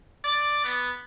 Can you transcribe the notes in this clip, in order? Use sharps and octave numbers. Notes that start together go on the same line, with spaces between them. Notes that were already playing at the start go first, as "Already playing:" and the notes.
D5
B3